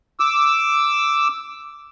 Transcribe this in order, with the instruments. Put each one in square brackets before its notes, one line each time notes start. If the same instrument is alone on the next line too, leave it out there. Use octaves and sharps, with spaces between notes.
[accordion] D6 E6